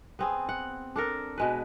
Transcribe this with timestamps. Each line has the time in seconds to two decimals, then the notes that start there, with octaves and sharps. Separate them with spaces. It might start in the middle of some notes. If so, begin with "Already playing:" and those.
0.19 B3 C4 G#4
0.49 F#5
0.96 D4 A4 A#4
1.38 B2 G#3 B4